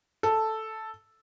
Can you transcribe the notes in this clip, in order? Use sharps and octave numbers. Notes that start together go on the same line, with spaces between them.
A4